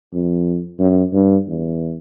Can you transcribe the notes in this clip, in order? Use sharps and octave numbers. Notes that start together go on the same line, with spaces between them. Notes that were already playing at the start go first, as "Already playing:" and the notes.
F2
F#2
G2
E2